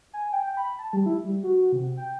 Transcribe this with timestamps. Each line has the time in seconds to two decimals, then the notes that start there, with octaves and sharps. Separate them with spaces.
0.13 G#5
0.33 G5
0.57 B5
0.79 A5
0.93 G3
1.06 E4
1.25 G3
1.43 F#4
1.72 C3
1.97 G5